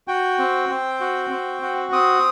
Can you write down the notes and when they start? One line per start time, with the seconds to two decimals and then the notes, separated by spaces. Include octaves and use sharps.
0.08 F#4 G5
0.38 C4
0.69 C4
1.00 F#4
1.30 C4
1.62 F#4
1.92 C4 D#6